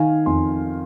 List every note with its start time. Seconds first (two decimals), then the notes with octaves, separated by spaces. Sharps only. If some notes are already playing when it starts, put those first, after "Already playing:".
Already playing: D#3 F5 G#5
0.26 F2 G#5 C6